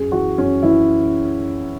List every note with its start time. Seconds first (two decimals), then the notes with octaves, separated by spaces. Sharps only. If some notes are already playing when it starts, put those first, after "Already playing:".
Already playing: F#2 G#4
0.12 E3 F#4
0.38 F#2 C#4
0.63 E3 E4